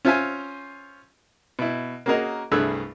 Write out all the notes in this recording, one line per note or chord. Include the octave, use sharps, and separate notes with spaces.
C#4 F4 C5 E5 F5 G#5
B2 E4
A#3 C#4 F#4 G#4 A#4 D#5
C2 G2 A3 G#4 E6 F#6